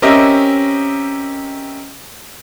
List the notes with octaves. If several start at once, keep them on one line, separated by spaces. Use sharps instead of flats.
C4 C#4 G4 A#4 D#5 E5